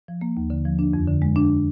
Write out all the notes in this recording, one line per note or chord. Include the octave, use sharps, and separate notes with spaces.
F3
A#3
D#2
D3
F3
D4
F2
D3
G#3
D4